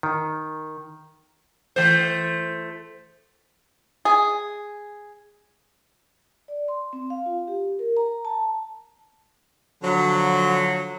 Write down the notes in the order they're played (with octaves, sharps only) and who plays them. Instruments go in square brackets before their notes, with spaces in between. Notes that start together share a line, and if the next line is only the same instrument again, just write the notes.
[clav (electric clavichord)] D#3
[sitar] E3 A3 C5
[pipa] G#4
[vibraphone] D5
C6
C4
F5
F4
G4
A#4
A#5
A5
[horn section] D3 F3 F#3